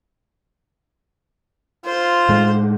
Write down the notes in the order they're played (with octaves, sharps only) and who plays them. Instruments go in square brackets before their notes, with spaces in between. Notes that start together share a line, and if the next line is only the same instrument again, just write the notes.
[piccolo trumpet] F4 [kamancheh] C5
[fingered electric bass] A2 G#3